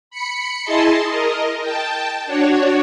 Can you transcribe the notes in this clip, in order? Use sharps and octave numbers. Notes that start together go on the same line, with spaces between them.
B5 C#7
E4 G#4 D#5 A5 C6
A#4 D#5
G5 A5
D4 F#4 C#5